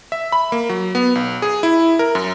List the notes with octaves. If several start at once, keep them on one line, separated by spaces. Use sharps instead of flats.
E5
B5
A#3
F#3
B3
B1
G#4
E4
A#4
F#2